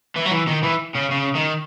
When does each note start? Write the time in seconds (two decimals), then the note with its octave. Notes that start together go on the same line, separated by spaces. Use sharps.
0.16 E3
0.26 F#3
0.32 E3
0.48 D#3
0.64 E3
0.96 C#3
1.12 C#3
1.36 D#3